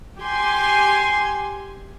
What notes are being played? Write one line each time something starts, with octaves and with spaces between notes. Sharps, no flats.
G4 G#5 C6